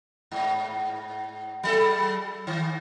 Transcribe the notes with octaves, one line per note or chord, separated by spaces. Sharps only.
G#2
F#3 A4
D#3